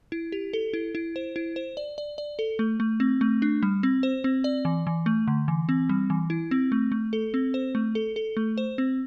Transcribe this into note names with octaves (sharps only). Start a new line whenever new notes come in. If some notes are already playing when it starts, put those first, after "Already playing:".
E4
G4
A4
E4
E4
C5
E4
C5
D5
D5
D5
A4
A3
A3
C4
A3
D4
G3
C4
C5
C4
D5
E3
E3
A3
D3
E3
C4
G3
E3
E4
C4
A3
A3
A4
C4
C5
A3
A4
A4
A3
C5
C4